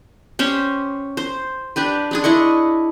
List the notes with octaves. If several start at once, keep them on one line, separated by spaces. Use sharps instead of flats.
C#4 G4 C5 C#5
C5
D4 G4 B4
G#3 D4 G#4
D4 E4 D#5 C#6